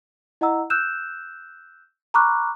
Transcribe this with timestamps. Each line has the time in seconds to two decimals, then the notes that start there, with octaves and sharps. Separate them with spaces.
0.41 E4 D#5 F#5 A#5 E6
0.70 E6 F#6 G6 E7
2.14 A#5 B5 C#6 D6 F6 F#6